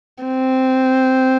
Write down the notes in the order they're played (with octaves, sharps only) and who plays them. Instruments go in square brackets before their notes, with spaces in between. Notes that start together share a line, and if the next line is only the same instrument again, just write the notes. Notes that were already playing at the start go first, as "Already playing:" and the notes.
[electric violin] C4